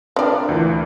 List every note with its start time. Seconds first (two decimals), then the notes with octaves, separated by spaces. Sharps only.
0.16 C4 D4 A#4 B4 D5
0.49 D2 A#2 E3